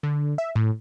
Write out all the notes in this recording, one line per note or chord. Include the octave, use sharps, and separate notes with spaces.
D3
E5
A2